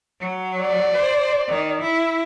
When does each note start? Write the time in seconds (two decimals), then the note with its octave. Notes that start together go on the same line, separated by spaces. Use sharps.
0.20 F#3
0.60 D5
0.93 C5
1.48 D#3
1.82 E4